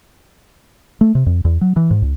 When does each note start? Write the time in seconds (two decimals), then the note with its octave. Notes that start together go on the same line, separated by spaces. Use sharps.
1.01 A3
1.15 C3
1.26 F2
1.45 E2
1.61 F#3
1.76 E3
1.91 G#2
2.02 C#2